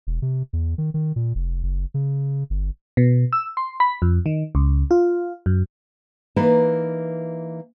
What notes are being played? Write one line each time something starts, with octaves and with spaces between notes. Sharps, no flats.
E1
C3
E2
D#3
D#3
A#2
F1
F#1
C#3
G1
B2
E6
C6
B5
F2
D#3
C#2
F4
F#2
E3 A#3 D#4 B4